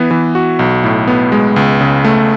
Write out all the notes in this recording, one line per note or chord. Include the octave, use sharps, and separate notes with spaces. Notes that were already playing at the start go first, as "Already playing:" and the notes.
Already playing: E3 B3
E3
F#4
B1
A2
B3
G#3
C#2
C#3
A3